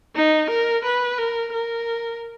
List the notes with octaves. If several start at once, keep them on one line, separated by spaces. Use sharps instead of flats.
D#4
A#4
B4
A#4
A#4